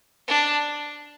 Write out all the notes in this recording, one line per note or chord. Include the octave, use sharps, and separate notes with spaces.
D4